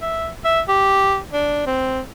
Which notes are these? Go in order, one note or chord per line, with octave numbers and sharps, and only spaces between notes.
E5
E5
G4
D4
C4